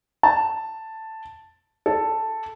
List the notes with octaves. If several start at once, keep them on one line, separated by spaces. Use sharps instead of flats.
A5
A4